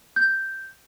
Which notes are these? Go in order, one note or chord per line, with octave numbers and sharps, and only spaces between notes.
G6